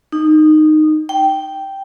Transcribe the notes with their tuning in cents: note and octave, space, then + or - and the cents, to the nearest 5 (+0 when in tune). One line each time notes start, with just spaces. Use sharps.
D#4 -15
G5 -5